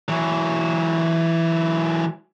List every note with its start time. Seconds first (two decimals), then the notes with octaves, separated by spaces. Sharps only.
0.09 E3 F#3